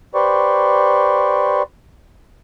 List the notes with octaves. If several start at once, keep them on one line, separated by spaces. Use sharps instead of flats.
G4 B4 C5 D5 C#6